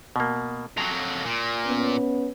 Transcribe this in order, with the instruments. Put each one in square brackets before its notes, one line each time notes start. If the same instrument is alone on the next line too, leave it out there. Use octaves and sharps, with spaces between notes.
[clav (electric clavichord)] B2 A#3
[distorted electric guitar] F2 F#3 [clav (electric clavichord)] A#5
[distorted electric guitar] A#2
[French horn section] B3 C#4